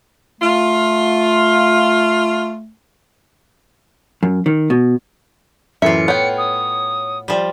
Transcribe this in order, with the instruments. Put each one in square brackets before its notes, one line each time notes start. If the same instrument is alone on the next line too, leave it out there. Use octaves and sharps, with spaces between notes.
[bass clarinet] A3 [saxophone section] F4
[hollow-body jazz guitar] F#2
D#3
B2
[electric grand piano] F#2 E3 [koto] A2 F4 [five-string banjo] E5 [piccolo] C#7
[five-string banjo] B3 G5 [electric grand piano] C#5
[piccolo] D#6
[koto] F3 G3